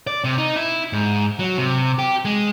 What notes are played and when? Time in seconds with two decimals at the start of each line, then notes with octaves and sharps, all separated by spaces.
0.07 D5
0.24 C3
0.38 D#4
0.56 E4
0.93 G#2
1.39 F#3
1.58 C3
1.99 G4
2.25 G#3